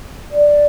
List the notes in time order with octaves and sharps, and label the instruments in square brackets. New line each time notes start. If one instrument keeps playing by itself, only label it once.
[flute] D5